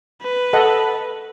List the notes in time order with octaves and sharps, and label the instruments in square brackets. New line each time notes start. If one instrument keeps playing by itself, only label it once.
[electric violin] B4
[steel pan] A4 D#5 F#5